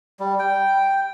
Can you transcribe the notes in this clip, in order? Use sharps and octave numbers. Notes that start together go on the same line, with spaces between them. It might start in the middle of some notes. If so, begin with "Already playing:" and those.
G3
G5